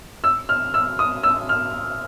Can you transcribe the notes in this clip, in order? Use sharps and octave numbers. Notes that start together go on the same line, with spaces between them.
E6
F6
E6
D#6
E6
F6